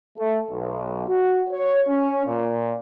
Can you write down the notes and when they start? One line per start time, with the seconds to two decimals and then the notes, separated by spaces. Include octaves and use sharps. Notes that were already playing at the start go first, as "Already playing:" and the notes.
0.18 A3
0.51 B1
1.08 F#4
1.50 C#5
1.88 C#4
2.26 A#2